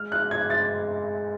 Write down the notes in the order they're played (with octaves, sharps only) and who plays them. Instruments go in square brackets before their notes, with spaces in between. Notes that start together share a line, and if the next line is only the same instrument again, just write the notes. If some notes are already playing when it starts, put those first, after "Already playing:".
Already playing: [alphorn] G#3 [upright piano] F6
[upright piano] F#6
G#6
A6